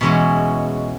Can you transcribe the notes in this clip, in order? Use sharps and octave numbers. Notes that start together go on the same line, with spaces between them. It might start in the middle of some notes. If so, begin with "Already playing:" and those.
E2 B2 G#3 C#4 E4